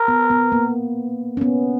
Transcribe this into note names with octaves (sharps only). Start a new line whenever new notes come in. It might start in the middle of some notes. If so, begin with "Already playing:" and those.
Already playing: A#4
B3
B3
A#3
C#4
B3